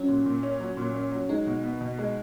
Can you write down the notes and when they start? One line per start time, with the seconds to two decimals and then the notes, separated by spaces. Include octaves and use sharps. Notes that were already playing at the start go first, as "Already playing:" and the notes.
Already playing: F#3 C#4
0.08 A#2
0.26 A#2
0.43 C#4
0.60 F#3
0.77 A#2
0.95 C#4
1.12 F#3
1.29 G#3 D#4
1.47 B2
1.64 B3
1.81 B2
1.99 G#3